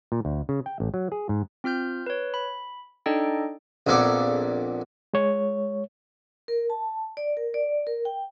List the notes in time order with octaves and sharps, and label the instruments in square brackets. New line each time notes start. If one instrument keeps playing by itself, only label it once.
[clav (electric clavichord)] A#2
D2
C#3
G5
A1
F#3
G#4
G#2
[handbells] C4 F4 F6 G6
B4 C#5
B5
D4 D#4 A4 D5 D#5 G5
[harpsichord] A#1 F2 A#2 B3 A4 D5
[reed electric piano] G#3 C#5
[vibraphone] A#4
A5
D5
A#4
D5
A#4
G5